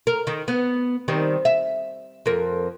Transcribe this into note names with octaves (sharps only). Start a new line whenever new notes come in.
A#4
D#3
B3
D#3 G3 C4
E5
F2 A#4